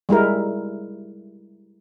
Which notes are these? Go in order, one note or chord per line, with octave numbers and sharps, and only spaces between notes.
G3 G#3 E4 A#4